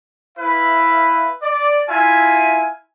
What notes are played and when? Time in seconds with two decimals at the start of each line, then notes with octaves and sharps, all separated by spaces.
0.38 E4 B4 E5 F5
1.42 D5
1.88 E4 F4 E5 G#5